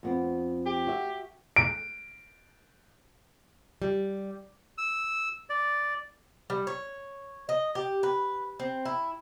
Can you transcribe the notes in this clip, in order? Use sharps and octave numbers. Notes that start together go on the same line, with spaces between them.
F2 B3 C4
G4
F#4 E5
D7
G3
E6
D5
G3
C#5
D#5
G4
B4
C4
E4